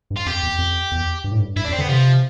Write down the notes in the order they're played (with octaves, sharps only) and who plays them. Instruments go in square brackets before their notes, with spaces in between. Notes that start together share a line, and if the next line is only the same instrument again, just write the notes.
[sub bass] G2
[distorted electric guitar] F4
[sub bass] F2 [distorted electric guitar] G4
[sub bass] E2
F2
E2
G2
A2
G2
[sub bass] G2 [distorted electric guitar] E4
[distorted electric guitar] D4
[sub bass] F2
[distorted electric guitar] C4
[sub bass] D3 [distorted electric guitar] B3
[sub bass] C3 [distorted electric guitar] F3